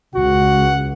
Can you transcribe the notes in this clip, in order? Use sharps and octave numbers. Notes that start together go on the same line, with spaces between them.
C#2 F#4 F#5